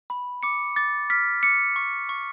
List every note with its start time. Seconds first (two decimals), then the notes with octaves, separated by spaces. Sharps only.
0.10 B5
0.43 D6 C#7
0.76 D6 A6
1.10 F6 B6
1.43 D6 C#7
1.76 C#6
2.09 C#6